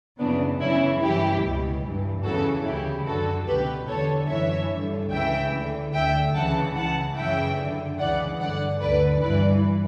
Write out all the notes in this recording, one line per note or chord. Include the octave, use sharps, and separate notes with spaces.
F#2 C#3 E3 B3 D4
F#2 C#3 E3 C#4 E4
G2 E3 E4 G4
C#2 B2
G2 E3
E2 C#3 E3 F#4 A4
D2 C#3 E3 E4 G4
F#2 D3 F#4 A4
C#2 B2 G4 B4
E2 D3 A4 C#5
F#2 E3 C#5 E5
G2 D3
C#2 C#3 E3 E5 G5
D2 D3
D2 D3 E5 G5
C#2 C#3 E3 F#5 A5
C#2 C#3 E3 F#5 A5
F#2 C#3 E3 E5 G5
F#2 D3
C#2 C#3 E3 D5 F#5
G2 D3 D5 F#5
D2 D3 B4 D5
G2 E3 B4 D5